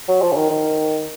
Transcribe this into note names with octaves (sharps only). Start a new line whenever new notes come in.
F#3
F3
C#3
D#3
D#3